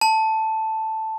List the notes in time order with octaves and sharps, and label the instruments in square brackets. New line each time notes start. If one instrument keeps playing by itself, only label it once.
[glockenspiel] A5